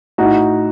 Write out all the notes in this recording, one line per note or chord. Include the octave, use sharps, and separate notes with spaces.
A2 D#4 F#4